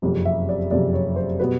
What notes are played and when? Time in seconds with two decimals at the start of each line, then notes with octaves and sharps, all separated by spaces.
0.02 F#1 F2 C3
0.25 E5
0.49 D5
0.71 F#1 F2 C3 D5
0.94 C#5
1.16 C5
1.39 B2 G3 B3 B4